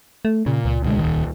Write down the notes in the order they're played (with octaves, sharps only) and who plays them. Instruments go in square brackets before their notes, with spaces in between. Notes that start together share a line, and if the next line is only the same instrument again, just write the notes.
[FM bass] A3
[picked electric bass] A#2 [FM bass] C#3
[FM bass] C#2
[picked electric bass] D2 B2 G#3
D#1 D#3